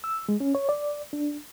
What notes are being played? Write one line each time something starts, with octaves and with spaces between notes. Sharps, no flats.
E6
G#3
C#4
C#5
D5
D4